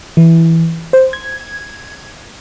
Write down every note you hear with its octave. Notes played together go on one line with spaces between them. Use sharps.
E3
C5
G#6